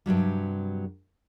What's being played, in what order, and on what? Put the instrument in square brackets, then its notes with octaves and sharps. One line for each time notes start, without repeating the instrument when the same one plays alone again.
[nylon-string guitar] G2 C3 F#3 G3